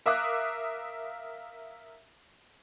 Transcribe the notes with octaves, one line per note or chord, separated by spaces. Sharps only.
A#4 E5 F5 D6 D#6 F#6